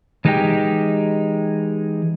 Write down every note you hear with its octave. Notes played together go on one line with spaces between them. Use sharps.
E3 G#3 D#4 G4 G5